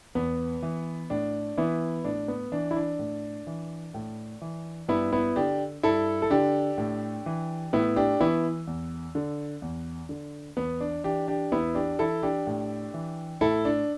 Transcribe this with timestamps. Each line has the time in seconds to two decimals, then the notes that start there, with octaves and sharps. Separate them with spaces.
0.15 E2 B3
0.63 E3
1.10 A2 D4
1.58 E3 B3 E4
2.04 A2 D4
2.28 B3
2.52 E3 D4
2.71 E4
2.76 D4
2.99 A2
3.47 E3
3.94 A2
4.41 E3
4.88 G2 B3 E4
5.12 B3 E4
5.36 D3 D4 G4
5.83 G2 E4 A4
6.22 A4
6.30 D3 D4 G4
6.78 A2
7.26 E3
7.73 A2 B3 E4
7.96 D4 G4
8.20 E3 B3 E4
8.67 E2
9.15 D3
9.62 E2
10.09 D3
10.57 E2 B3
10.80 D4
11.04 E3 D4 G4
11.28 D4 G4
11.52 E2 B3 E4
11.75 D4 G4
11.99 E3 E4 A4
12.23 D4 G4
12.47 A2
12.94 E3
13.41 A2 E4 A4
13.65 D4